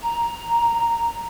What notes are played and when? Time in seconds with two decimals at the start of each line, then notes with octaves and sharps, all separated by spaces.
0.02 A#5